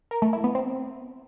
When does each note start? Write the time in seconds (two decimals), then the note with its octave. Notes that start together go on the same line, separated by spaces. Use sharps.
0.11 A#4
0.22 A3
0.33 E4
0.44 B3
0.55 C4